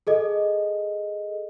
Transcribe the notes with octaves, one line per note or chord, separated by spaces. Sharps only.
G#4 A4 D#5